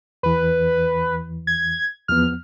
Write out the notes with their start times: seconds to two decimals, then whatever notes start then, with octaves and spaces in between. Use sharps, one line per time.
0.23 E2 E3 B4
1.47 G#6
2.08 E2 F3 B3 F6